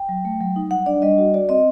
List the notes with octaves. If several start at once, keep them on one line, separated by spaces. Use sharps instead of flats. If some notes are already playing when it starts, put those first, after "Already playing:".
Already playing: G5
F#3
A3
F#3
D#4
G3 F#5
D4 D5
G3 D#5
F#4
F#4 D5
C4 D#5